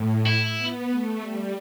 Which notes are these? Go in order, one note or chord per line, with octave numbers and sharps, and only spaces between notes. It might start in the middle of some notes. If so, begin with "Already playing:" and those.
Already playing: A2
E4
B3
A3
G3